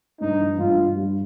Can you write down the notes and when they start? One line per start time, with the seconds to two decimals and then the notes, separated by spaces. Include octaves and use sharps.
0.20 G2 D#4
0.39 E3
0.58 G2 F4
0.77 G2
0.96 G3